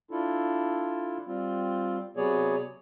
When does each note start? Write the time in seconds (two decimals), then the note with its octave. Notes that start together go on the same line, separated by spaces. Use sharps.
0.11 D4 E4 F4 A4
1.26 G3 C4 F4
2.17 C3 F#3 B3 G#4 C#5 D5